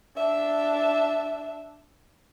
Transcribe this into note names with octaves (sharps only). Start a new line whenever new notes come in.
D4 E5